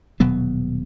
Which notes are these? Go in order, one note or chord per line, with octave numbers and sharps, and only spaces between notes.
D#1 B2 F#3 B3